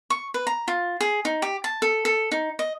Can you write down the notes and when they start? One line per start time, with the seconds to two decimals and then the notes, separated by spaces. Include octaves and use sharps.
0.10 C#6
0.34 B4
0.47 A#5
0.68 F4
1.01 G#4
1.25 D#4
1.42 G4
1.64 A5
1.82 A4
2.05 A4
2.31 D#4
2.59 D#5